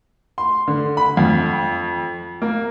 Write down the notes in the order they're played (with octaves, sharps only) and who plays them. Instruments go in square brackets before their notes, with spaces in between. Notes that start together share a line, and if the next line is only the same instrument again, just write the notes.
[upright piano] C6
D3
B5
F2
A#3